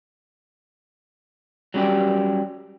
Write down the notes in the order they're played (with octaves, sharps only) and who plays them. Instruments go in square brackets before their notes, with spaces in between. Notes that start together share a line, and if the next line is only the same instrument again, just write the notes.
[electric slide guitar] F#3 G3 C#4 G4 D5